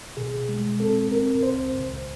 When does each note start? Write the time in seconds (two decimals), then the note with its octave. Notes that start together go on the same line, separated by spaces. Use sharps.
0.17 B2 G#4
0.49 G#3
0.80 C4 A4
1.11 C4 A#4
1.43 C#2 C5
1.75 C#2